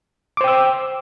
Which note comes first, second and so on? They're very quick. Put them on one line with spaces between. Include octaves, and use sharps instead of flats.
D6 C5 G5 E6